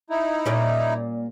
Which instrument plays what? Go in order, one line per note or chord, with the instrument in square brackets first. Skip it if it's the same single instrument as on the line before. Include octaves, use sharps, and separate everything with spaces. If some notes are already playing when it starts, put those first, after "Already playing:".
[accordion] D#4 E4
[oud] A#2 G3 C#4